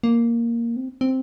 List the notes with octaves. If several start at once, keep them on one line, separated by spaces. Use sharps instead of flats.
A#3
C4
C4